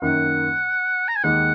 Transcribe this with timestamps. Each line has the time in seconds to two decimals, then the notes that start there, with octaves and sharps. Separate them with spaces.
0.02 F#2 D#3 A#3 F#5
1.08 A#5
1.16 G#5
1.24 D#2 D#3 G#3 D#4 F#5